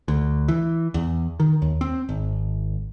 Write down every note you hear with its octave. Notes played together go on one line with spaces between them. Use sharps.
D2
E3
E2
D#3
D#2
C4
G#1